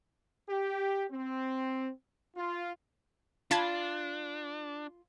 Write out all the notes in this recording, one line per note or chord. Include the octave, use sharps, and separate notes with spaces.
G4
C4
F4
D4 F4 A5 B5 G#6